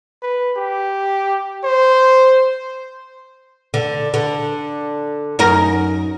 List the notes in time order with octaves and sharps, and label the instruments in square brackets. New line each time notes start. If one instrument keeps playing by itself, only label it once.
[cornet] B4
G4
C5
[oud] D3
D3
F#2 D#4 A#4